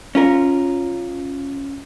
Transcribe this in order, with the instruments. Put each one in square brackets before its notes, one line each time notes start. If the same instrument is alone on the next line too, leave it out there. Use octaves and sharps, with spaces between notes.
[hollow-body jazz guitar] C#4 F4 A#4